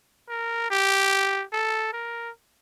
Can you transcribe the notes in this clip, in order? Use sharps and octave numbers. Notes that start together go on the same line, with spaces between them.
A#4
G4
A4
A#4